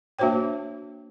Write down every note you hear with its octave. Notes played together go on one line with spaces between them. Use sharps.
A#3 D4 F#4 C5 C#5 G5